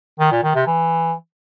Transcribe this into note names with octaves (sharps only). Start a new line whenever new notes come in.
D#3
A#2
D#3
C3
E3